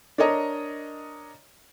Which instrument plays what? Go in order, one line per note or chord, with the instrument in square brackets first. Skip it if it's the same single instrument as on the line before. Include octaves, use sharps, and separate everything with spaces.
[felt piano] D4 A#4 C#5 D#5 A#5